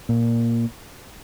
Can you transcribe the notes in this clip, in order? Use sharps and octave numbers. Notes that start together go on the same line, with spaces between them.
A#2